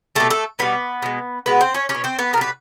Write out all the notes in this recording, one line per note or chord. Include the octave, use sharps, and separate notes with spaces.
B2 G3 A3 A4
A3 A4
B2 G3 B3 B4
B2 G#3
B2 G#3 B3 B4
C4 C5
C#4 C#5
G3 C#4 C#5
B2
C4 C5
B3 B4
B2 G3 A#4 B4